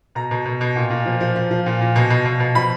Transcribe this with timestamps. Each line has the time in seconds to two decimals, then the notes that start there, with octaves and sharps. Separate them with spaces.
0.15 B2 A#5
0.31 B2
0.45 B2
0.61 B2
0.76 A#2
0.90 A#2
1.06 F3
1.20 F3
1.36 F3
1.51 F3
1.66 A#2
1.81 A#2
1.96 B2
2.10 B2
2.25 B2
2.40 B2
2.55 F3 B5